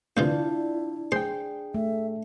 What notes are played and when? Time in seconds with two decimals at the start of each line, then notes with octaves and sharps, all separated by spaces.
0.17 D2 C3 E3 D4 E4 F4 G6
1.12 G#4 C5 G5
1.74 A3 E5